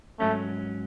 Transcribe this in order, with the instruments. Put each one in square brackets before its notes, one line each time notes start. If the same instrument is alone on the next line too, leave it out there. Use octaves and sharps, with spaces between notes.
[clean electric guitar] G#2 F#3 C#4 [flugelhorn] A3